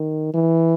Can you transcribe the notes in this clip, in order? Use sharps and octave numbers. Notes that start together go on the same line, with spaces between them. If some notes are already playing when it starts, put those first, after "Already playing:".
Already playing: D#3
E3